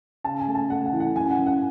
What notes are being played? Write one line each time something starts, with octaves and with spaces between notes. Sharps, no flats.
C#3 A5
G#5
A3
A5
A3 F#5
F#5
E3
F#5
F#2 G#5
F#5
F#2
F#5